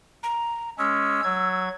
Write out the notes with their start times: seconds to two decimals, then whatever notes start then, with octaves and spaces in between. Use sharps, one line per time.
0.23 A#5
0.78 G#3 C#4 E6
1.24 F#3 G#6